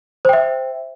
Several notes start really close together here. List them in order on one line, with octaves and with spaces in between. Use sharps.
C5 G5 E5